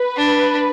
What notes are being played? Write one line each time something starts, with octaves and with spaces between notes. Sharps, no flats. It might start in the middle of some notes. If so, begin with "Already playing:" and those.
Already playing: B4
D4